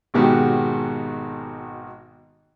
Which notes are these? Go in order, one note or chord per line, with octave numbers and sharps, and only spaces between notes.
G#1 G#2 B2 D#3 F#4 G4